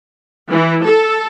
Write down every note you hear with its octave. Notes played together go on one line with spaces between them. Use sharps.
E3
A4